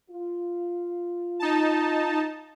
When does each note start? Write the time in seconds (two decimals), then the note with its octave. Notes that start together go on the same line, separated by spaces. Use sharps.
0.11 F4
1.39 D#4 A5